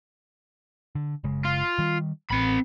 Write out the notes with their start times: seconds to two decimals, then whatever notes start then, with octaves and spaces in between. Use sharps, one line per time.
0.95 D3
1.24 F#1 C#3 G#3
1.45 F4
1.79 D#3 G3
2.30 A1 C4 B5